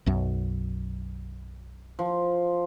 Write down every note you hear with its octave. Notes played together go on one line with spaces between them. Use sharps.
B1 F#2
F3